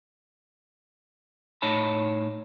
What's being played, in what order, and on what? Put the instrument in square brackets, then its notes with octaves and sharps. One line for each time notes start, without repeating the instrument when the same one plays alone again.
[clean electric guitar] A2 D#4 C#5 A5 B5